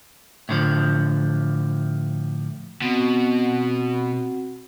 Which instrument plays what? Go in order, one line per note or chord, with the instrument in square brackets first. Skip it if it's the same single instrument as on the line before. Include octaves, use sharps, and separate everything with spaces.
[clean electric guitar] A2 D3 F3
[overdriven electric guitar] B2 [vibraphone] C4 F#4 F#5